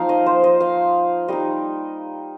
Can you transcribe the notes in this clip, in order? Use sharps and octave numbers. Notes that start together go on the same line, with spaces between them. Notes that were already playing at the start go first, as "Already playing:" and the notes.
Already playing: F3 A#3 D#4 F5
D#5
C5
D#5
F5
G3 A#3 D#4 D#5